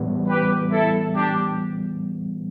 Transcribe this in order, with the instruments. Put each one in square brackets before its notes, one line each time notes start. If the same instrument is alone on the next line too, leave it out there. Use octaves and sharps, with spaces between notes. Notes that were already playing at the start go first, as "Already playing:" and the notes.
Already playing: [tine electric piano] A2 E3 G3 B3
[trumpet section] G4 B4
E4 A4
D4 G4